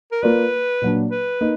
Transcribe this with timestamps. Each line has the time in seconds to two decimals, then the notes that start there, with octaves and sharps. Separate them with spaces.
0.12 A#4
0.23 A#3 F4 A#4 B4 D5
0.82 A#2 F#3 D4
1.11 B4
1.41 A#3 D#4